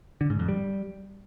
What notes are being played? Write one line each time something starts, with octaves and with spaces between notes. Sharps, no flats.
D3
G#2
F2
G3